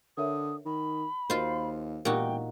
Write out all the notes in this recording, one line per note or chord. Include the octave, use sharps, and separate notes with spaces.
D3 A#4 C#5 E5 D#6
D#3 B5
D#2 F4 F#4 A#4 C5 D#5
E1 A#2 D#4 F#4 G4 A#4 G5 D6